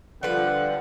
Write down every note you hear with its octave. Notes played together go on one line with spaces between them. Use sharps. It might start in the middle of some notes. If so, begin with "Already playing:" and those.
D3 F3 G3 B4 F#5